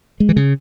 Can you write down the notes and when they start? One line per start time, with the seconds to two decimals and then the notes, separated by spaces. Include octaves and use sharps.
0.20 G#3
0.29 E3
0.36 C#3